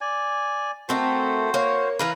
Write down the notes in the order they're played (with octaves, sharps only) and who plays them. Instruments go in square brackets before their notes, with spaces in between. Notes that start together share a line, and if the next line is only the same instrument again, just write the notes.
[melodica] D5 G#5
[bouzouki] A3 C4 A#4 [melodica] F#4 C5
[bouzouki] A#3 C#5
[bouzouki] E3 A#4 B4 [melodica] F5